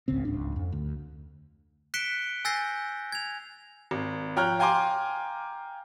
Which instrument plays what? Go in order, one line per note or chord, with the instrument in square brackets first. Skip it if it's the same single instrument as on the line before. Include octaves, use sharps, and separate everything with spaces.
[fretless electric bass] G#1 C#2 C#3 C4
D1 C#2 G#2 D4
F2
D2
[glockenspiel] F#6 B6 C#7 D7 E7 G7
G#5 E6 G6 A6 A#6 C7
G#6 F7
[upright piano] G#1
F3 C#5 G5 A#5 F6 F#6
F5 G5 G#5 A#5 C6 D6